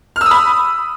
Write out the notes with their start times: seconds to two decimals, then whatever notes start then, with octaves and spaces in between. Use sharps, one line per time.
0.16 F6
0.21 E6
0.26 D#6
0.31 B5